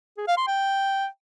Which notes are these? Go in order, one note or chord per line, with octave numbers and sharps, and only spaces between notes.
G#4
F5
C6
G5